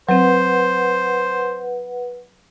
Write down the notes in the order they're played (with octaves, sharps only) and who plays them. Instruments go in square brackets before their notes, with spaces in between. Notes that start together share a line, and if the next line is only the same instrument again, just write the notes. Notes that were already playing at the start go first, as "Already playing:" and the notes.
[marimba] F#3 C4 [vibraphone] B4 F#5 [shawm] C5